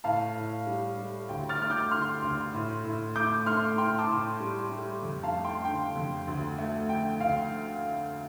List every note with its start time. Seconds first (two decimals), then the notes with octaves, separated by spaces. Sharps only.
0.04 A2 F5 A5
0.35 A2
0.66 G3
0.97 G3
1.29 D2 G5
1.49 F6 A6
1.60 A3 F6
1.70 D6 G6
1.91 D3 C6 F6
2.22 D2
2.54 A2
2.84 A2
3.16 A3 D6 G6
3.46 A3 C6 F6
3.78 A2 G5 C6
3.98 A5 D6
4.09 A2
4.40 G3
4.71 G3
5.02 F2
5.23 F5 A5
5.34 A3
5.44 G5 C6
5.65 D3 G5
5.96 F2
6.27 D2
6.58 A3
6.89 D3 G5
7.20 D2 F5